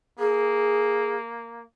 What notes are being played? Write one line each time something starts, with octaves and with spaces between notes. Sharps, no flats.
A#3 G#4